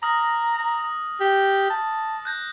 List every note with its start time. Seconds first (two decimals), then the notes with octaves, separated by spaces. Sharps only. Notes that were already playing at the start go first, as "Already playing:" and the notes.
0.03 A#5 D#6 F6 A#6
1.21 G4
1.70 A5
2.25 F#6 G6 A#6